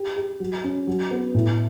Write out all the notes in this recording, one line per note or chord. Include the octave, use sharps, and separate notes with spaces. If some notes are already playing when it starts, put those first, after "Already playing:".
Already playing: G4
G4
F#3
C#4
F#3
B3
A2